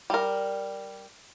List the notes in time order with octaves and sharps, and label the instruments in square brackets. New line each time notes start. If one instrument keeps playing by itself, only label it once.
[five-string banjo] G3 A#4